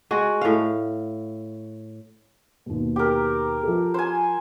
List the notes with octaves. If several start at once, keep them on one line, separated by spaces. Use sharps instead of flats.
G#3 F#4
A2 F5
D#2 B2
G4 A#4
F3 A4
C5 G#5